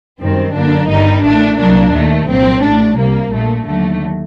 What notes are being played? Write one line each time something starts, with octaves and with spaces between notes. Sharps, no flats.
F#2 D#3 G3 C4
F#2 D3 F#3 A#3 D4
G1 G2 D#3 G3 D#4
A1 A2 A3 D4
C2 A#2 F#3 A#3 D4
D#2 D#3 A3
C2 A#2 F#3 C4
A1 A2 A3 D4
C2 C3 G3 A#3
A#1 A#2 A3
D#2 D3 F#3 A3